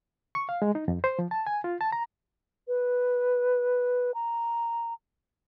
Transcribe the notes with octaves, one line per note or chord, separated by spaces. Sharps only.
C#6
F5
G#3
D#4
F2
C5
F3
A5
G#5
F4
A5
A#5
B4
A#5